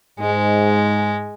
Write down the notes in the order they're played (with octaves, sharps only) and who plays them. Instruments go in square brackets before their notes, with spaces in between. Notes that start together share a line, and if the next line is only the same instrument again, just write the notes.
[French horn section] G#2 [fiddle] G#3